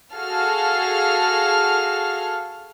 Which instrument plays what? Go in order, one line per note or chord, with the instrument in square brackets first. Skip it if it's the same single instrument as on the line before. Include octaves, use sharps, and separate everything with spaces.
[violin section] F#4 G#4 A4 F5 A5 F6